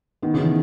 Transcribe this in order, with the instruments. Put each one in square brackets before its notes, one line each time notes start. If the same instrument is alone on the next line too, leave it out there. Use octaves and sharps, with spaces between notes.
[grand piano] D#3 [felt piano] B3
[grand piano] C#3
[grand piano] D#3 [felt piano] E3